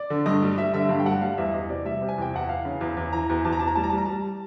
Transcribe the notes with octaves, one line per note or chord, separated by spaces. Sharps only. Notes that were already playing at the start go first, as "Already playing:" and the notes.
Already playing: D5
D3
G2 D#5
G3
G3 E5
D3 E5
G2 F5
G5
G3 F#5
G3 F5
E2 E5
E2 D#5
C3 D5
G3 E5
C3
G#5
E2 G5
E2 F#5
E3 F5
C#3
E2
E2
E3 A#5
E2
E2 A5
A#5
E2 A5
A#5
G3 A5
A#5
A5
G3
A#5
G3 A5